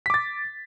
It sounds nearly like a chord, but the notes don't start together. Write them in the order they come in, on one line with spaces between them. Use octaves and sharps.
B6 D6 A6